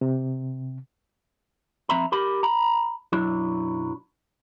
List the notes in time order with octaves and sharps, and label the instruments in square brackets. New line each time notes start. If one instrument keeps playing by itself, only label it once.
[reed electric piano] C3
[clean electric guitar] F3 C4 E5 A#5 B5
G4 A#4 B5
A#5 B5
B1 F#2 F#3 D4 E4